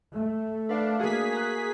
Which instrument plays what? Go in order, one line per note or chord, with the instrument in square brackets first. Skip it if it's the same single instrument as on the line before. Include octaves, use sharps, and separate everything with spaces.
[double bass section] A3
[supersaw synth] D4 [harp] B4 F5
[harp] A#3 F#4 [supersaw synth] G#4 B6
[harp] A#5 F#6